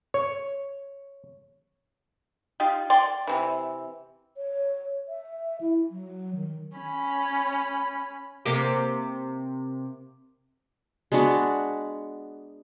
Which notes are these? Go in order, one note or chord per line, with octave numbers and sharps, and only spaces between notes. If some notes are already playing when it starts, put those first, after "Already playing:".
C#5
D#4 F4 G4
D5 G5 C6
C3 E3
C#5
E5
E4
F#3
D#3
C#4 B5
C3 A#3 G4
G#3 B3 D4 F#4